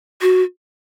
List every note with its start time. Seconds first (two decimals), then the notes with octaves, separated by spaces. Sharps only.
0.22 F#4